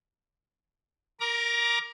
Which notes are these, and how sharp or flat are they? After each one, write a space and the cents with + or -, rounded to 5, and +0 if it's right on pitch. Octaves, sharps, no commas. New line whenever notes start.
A#4 +0 A#5 +25 D6 +0